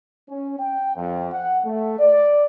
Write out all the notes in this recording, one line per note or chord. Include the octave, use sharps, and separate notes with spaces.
C#4
G5
F2
F#5
A3
D5